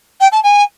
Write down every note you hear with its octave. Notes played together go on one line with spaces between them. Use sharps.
G5
A5
G#5